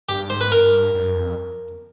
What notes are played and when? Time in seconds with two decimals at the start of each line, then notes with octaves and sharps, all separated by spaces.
0.09 G2 G4
0.30 G#2 C5
0.41 B4
0.51 G2 A#4
0.94 F#2
1.15 F2